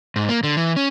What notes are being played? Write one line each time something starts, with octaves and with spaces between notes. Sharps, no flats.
G#2
A#3
D3
E3
C#4